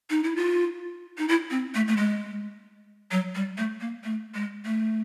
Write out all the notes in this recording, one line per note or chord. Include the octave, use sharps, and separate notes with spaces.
D#4
E4
F4
D#4
E4
C4
A3
A3
G#3
F#3
G3
A3
A#3
A3
G#3
A3